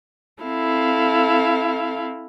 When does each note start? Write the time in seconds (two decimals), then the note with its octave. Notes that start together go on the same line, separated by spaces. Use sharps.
0.42 C4 E4 A4 F5